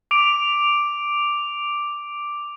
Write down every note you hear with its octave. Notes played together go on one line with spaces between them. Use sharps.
D6 D7 F7